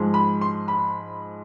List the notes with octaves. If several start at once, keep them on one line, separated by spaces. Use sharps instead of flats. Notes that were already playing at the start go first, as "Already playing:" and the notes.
Already playing: G#2 F3 G#3
B5
C6
B5